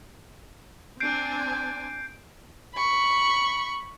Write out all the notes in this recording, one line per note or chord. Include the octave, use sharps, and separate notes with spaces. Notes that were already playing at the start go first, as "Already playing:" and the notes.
C4 D4 G#5 G6 C7 D7
B5 C#6